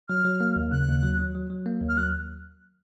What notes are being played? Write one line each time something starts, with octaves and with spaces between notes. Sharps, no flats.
F#3 F6
F#3
A#3
D#2
C#3 F#6
D#2
F#3
F#3
F#3
F#3
A#3
D#2
F6
F#3 F#6